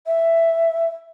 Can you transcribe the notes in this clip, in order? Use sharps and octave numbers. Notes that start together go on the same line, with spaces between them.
E5